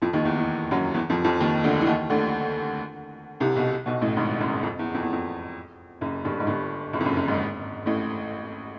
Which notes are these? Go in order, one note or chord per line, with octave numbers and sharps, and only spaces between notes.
F2 F3
D#2 D#3
E2 E3
E2 E3
F#2 F#3
E2 E3
F2 F3
F2 F3
D#2 D#3
D2 D3
E3
D#2 D#3
D2 D3
C2 C3
B1 B2
B1 B2
A1 A2
G#1 G#2
F#1 F#2
F2
E2
F2
E2
F2
F#1 F#2
G1 G2
G#2
G1 G2
F#1 F#2
F2
F#1 F#2
F#1 F#2
G#1 G#2
A1 A2